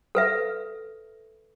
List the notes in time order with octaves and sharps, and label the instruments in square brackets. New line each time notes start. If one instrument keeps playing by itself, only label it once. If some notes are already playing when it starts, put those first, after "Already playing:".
[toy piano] A4 B4 E5